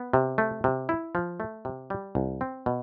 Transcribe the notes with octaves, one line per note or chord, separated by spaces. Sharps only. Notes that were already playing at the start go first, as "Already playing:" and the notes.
Already playing: B3
C3
A3
C3
E4
F3
A3
C3
G3
C2
C4
B2